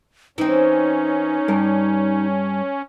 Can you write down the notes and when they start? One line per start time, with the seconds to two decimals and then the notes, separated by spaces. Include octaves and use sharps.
0.38 E3 C4 C#4 D#4
1.48 G2 A#4